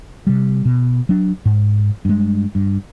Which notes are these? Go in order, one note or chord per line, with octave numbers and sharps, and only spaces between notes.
C3 G3
B2
F#3 D4
G#2
G2 G#3
G2